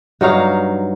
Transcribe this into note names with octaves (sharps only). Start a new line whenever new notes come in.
G2 F#3 D#4 F5